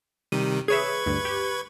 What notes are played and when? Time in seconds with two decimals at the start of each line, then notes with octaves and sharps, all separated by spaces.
0.32 C3 D#3 G3 D#7
0.68 G#4 B4 C#5 E5 C#6 G#6
1.06 D2 G2
1.25 G4